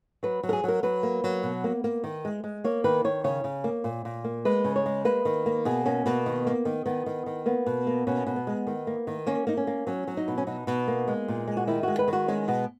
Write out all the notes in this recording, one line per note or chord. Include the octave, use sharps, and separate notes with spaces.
F#3 B4
F#3
A#4
G#4
F#3 A#4
F#3 B4
A#3
F#3
B2
A#3
A#3
D#3
G#3
G#3
A#3 C#5
D#3 B4
D#3 C#5
C#3 C#5
C#3
A#3
A#2
A#2
A#3
G#3 B4
C#3
C#5
G#3
A#3 B4
D#3
A#3
B2 G#4
A#3 C#4
B2 A#3
D#3
A#3
D#3
D#3 B3
D#3
D#3
A#3 B3
B2
A#3
B2 C#4
B2
B3
G#3
D#3
A#3
D#3
A#3 C#4
A#3 D#4
C#4
A#3
F#3 C#4
F#3
D#4
B2
C#4
B2 D#4
B2
A#3
G#3
A#2
G#3
F#4
D#3 E4
G#3 F#4
B4
D#3
F#4
G#3 C#4
B2 B3